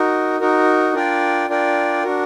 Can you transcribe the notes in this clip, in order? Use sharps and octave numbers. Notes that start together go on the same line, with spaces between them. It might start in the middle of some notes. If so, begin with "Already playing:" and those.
Already playing: D#4 F#4 A#4
D#4 F#4 A#4
D4 F4 A#4 D5 G5
D4 F4 A#4 D5 G5
D4 F#4 A#4